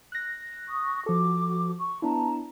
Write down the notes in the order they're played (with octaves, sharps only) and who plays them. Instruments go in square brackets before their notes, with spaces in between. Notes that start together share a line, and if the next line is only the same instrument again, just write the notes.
[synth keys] F#6 A#6
[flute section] C#6 D#6
[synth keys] F3 A4 [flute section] F#4 D6
[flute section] C#6
[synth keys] B3 D4 E4 [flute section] A5 A#5